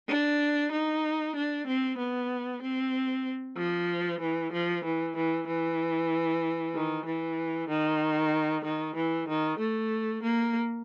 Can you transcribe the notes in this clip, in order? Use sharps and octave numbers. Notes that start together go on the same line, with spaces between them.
D4
D#4
D4
C4
B3
C4
F3
E3
F3
E3
E3
E3
D#3
E3
D#3
D#3
E3
D#3
A3
A#3